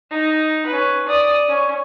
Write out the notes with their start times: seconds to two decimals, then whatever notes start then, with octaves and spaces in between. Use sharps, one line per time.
0.10 D#4
0.66 C#4 B4
1.07 D5 D#6
1.49 C#4